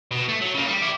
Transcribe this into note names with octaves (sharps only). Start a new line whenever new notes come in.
B2
A3
F#3
C#3 A#3
G3
E4 G4